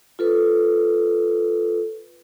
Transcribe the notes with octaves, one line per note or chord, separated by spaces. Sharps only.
F4 A4 B4